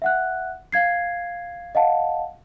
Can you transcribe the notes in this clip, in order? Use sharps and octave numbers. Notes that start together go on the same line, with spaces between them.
E5 F#5 F#6
F5 G#6 C7
D#5 F5 F#5 A5